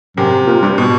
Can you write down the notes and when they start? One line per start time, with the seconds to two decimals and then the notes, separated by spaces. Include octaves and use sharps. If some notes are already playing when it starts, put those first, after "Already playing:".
0.17 F#2 C3
0.47 A#2
0.62 G2
0.78 B2